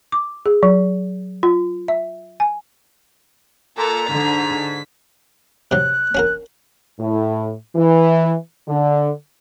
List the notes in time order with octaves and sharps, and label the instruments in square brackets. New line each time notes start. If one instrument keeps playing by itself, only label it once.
[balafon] D6
G#4
F#3
F4
E5
G#5
[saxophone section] A#2 [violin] A4 [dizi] A#5
[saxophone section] G#2 [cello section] D3 [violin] B6
[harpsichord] C3 F#3 [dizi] F#6
[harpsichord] C#4 F#4 A#4
[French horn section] A2
E3
D3